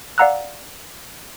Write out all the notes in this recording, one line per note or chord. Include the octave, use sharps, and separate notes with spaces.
D5 F5 F#5 A#5 E6 F#6